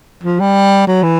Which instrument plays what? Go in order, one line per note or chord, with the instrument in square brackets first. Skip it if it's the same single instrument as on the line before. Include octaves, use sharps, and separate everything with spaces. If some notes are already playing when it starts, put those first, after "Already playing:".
[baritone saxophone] F3
G3
F#3
E3